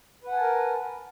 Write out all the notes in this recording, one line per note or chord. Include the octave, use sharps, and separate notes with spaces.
A#4 B4 F#5 G#5 A5